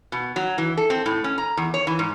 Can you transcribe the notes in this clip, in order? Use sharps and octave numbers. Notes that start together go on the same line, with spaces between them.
B2
F#3
E3
A4
C4
A2
C#4
A#5
E2
C#5
E3
G#2